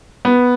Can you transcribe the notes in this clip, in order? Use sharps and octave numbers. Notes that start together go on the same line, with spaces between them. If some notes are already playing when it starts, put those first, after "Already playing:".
B3